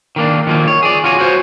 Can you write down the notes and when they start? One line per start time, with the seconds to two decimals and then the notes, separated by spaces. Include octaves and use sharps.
0.16 D#3 A#3 D4
0.47 D#3 F3 A#3
0.68 C#5
0.83 G#4 D5
1.04 F4 F#4 C#5 G#5
1.19 F#4 C5 C#5